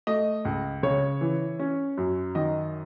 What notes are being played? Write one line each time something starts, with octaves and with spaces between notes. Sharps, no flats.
A3 D#5
C#2
C#3 C#5
E3
C#4
F#2
D#3 D#5